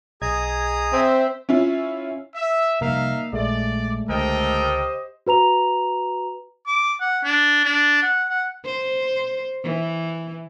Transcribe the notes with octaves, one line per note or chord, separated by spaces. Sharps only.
B1 G#4 D#5 A#5 D#6 G#6
C4 C5 E5
C#4 E4 F4
E5
C3 F3 G3 A#3 D#4 A#4 E5 F5
A#1 G#3 A3 D5
C#2 D3 G4 A4 A#4 C5 D#5 G5
F#4 B4 A#5 F7
D6
F#5
D4
D4
F#5
F#5
C5
E3